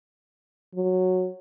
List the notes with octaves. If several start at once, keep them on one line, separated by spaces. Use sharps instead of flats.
F#3